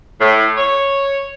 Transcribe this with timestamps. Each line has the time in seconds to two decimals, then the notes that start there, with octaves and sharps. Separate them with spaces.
0.20 A2
0.57 C#5